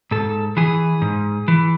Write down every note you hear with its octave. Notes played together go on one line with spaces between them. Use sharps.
G#2 A4
E3 G#4
G#2
E3